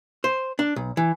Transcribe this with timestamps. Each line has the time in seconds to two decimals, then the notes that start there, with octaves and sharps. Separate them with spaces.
0.24 C5
0.59 D4
0.76 B1
0.97 E3